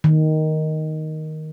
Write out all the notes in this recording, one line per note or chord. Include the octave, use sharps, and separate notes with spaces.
D#3